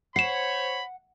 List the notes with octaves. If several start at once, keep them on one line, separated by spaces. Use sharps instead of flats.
C5 C#5 F#5 B5 C7 E7